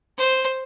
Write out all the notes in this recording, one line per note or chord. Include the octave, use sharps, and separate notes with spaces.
C5